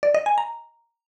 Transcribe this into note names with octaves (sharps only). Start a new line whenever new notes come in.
D5
D#5
G#5
A#5